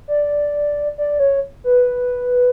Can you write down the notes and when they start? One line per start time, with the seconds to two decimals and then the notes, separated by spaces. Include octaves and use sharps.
0.08 D5
0.98 D5
1.19 C#5
1.64 B4